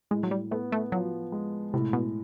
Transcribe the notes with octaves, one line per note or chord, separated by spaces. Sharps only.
A2 G#3
F#3
G3
A3 B3
A3
F3 F#3
G#3
A2 C3
B2